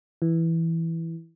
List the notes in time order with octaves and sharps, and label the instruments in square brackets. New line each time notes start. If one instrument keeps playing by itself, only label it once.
[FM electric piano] E3